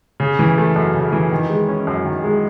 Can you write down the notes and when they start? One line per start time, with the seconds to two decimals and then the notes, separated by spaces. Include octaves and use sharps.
0.20 C#3
0.39 E3
0.58 A3
0.76 F#2
0.94 C#3
1.12 E3
1.32 D#3
1.50 G#3
1.69 C#4
1.87 F#2
2.05 D#3
2.24 G#3